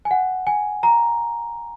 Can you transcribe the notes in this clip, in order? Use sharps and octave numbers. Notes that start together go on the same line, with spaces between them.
G#5
F#5
G#5
A#5